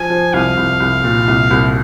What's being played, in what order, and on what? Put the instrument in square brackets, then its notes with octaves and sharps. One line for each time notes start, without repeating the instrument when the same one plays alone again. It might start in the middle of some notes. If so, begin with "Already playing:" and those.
Already playing: [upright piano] F3 [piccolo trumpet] G#5
[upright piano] F3
[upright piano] C2 [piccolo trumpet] F5
[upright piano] C2
C2
A#2
C2
C2